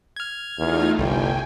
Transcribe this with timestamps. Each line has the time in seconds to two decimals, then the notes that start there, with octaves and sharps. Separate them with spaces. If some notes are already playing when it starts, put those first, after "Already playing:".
0.16 F6 G#6
0.59 E2 A3 D#4 F4
0.98 G1 C2 G5 G#5